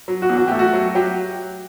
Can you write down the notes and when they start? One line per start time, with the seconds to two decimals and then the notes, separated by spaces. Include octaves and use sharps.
0.08 F#3
0.22 F#4
0.29 E2
0.37 F#4
0.48 A3 G4
0.59 F#4
0.73 F#3
0.95 F#3 G4